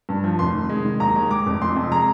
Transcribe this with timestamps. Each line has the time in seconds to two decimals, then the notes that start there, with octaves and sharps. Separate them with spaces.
0.09 G2
0.24 F3
0.39 F1 C6
0.55 D#3
0.69 G#3
0.85 D#3
1.00 D#2 A#5
1.16 G#3
1.31 G#3 D6
1.46 F1
1.62 F2 C6
1.76 F2
1.92 G#3 A#5